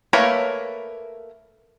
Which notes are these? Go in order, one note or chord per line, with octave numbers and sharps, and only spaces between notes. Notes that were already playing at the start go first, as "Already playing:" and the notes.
A3 A#3 A#4 B4 C#5